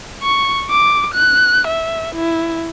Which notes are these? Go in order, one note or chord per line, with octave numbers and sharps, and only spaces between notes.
C#6
D6
F#6
E5
E4